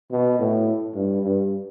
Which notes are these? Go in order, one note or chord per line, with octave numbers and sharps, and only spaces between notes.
B2
A2
G2
G2